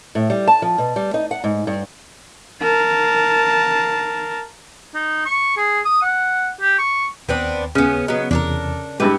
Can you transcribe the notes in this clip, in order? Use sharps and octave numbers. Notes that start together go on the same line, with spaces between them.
A2
G3
A5
F3
B2
G3
D#4
F#5
G#2
G2
A#4 A5
D#4
C#6
G#4
D#6
F#5
G4
C#6
D#2 B3 C4 D4 G5
C#3 B3 C#4
F#3 B3 D#5
E2 C3 D4 A4 A#4
G2 G#3 B3 E4 G4